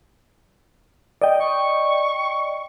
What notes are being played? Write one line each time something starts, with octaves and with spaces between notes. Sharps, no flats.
D5 D#5 G5
C#6